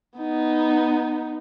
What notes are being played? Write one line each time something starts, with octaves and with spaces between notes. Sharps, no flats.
B3 D#4